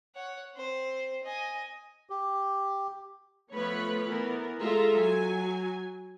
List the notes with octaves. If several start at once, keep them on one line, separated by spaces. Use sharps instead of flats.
C#5 F#5
C4 C5
D#5 G#5
G4
F3 A3 B3 B4 C#5 B5
E3 B3 A#4
G#3 F4 A4 E5 A#5
F#3 G#5